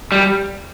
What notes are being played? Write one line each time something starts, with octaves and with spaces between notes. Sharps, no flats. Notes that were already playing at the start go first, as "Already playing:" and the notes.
G3